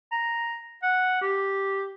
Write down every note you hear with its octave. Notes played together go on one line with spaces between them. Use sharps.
A#5
F#5
G4